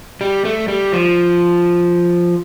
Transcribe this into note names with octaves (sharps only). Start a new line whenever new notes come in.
G3
A3
G3
F3